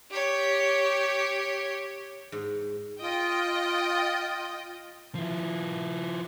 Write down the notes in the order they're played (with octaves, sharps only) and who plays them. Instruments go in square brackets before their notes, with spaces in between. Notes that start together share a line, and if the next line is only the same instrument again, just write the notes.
[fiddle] G4 C#5
[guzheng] G#2
[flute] F4 [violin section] D#5 G5
[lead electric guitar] F3 E4